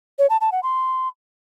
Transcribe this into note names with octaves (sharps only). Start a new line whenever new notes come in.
C#5
A5
A5
F#5
C6